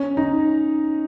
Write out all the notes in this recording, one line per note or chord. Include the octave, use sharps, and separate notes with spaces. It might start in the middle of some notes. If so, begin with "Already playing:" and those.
Already playing: C#4
D#4